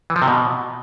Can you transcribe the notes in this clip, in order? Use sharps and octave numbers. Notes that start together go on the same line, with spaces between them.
E3
F3
C3
B2